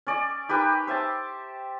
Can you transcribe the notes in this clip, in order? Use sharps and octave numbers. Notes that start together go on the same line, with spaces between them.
C#4 D5 D#5
D#4 G4 A#4 B4
C5 E5 G5 A5